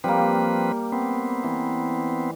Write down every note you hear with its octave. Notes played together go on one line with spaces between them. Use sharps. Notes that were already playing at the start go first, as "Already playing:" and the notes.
F3 G3 A#3 C4 B4
B3 C4
E3